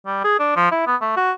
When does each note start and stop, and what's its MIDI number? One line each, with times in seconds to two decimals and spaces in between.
0.06 0.23 55
0.24 0.37 68
0.40 0.53 62
0.56 0.71 53
0.72 0.84 64
0.87 0.96 59
1.01 1.13 57
1.17 1.31 66